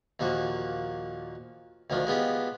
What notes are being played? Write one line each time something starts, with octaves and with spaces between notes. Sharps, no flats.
D#2 A#2 F3 F#4
D2 D#3 F3 D4
G#3 B3 F4 G4